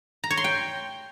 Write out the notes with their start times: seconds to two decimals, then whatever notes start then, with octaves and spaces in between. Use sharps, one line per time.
0.24 A#5
0.30 C#5
0.37 C6
0.44 G5